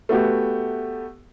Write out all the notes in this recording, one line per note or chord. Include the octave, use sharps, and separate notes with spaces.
A3 B3 F#4 G4